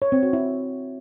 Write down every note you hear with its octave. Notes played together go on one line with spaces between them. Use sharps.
C#5
C4
F#4
E4